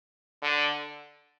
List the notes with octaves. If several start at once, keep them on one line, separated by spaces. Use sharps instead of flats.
D3